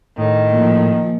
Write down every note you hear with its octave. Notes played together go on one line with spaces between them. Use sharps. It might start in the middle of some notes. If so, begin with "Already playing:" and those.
A2 D#3
A#2 F3